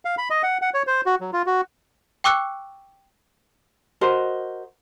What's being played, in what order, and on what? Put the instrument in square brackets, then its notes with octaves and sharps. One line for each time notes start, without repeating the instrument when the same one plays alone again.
[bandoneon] F5
B5
D#5
F#5
F#5
C#5
C5
F#4
F#3
F4
F#4
[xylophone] G5 C#6 D6 E6 F#6 C#7
[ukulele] F#4 A#4 C5 D#5